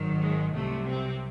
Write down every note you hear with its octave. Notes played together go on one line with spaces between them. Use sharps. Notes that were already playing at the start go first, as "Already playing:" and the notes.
Already playing: G#1 G#2 D#3 F#3
G#3
C2 C3 F#3 A3
C4